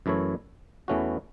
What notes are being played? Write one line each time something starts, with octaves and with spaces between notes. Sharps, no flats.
F#2 E3 A3 E4 C#5
E2 E3 A3 C#4 F#4